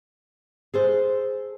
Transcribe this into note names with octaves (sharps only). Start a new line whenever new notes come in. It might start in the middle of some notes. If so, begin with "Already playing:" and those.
G#4 A4 C5